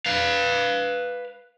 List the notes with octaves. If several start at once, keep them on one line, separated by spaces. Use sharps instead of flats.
B4 F5